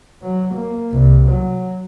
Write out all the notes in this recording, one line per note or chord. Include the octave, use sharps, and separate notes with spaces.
F#3
A#3
C2
F#3